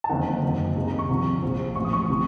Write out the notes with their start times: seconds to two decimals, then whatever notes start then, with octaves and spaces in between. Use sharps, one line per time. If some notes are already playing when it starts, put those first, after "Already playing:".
0.04 A5
0.09 F#1 F2 D#3 F#5
0.42 F#1 F#2 D#3
0.76 C#2 C3 D#3
0.87 A#5
0.99 C#6
1.09 C2 C3 F3
1.42 A#1 A#2 F3
1.76 A1 A2 F3 C#6
1.85 D#6
1.93 C#6
2.08 C3 F3